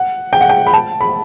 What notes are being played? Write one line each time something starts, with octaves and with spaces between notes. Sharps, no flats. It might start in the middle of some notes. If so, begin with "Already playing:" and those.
Already playing: F#5
G5
F#5
G5
B5
A5
B5